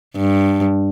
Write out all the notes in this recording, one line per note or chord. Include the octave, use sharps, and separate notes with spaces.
G2